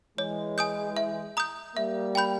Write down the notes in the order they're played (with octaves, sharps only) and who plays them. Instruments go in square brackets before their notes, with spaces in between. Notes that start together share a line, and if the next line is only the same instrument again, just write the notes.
[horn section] E3 G#3 [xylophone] C#5
[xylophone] G#5 D#6 G6
E5
A#5 D#6 G6
[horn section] G3 A#3 [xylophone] E5
[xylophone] G5 B5 G6